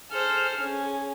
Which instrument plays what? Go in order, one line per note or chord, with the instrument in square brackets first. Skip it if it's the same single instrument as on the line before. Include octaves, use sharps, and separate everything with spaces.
[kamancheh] G#4 F6 [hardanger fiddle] A4 C5
[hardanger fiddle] C#4 [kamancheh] G#4